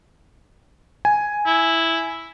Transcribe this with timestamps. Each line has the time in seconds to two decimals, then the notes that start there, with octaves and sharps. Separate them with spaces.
1.05 G#5
1.46 E4